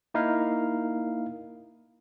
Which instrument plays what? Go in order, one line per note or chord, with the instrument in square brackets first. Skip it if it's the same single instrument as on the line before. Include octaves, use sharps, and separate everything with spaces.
[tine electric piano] A#3 D#4 E4 A#4 F5